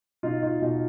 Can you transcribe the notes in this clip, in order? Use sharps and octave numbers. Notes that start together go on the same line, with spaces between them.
B2 D#4 F4
D#4 F4
B2 D#4 F4